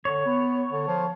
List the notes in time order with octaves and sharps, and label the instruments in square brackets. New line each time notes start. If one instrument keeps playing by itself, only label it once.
[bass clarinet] D3 [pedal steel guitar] C#5
[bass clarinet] B3
D3
F3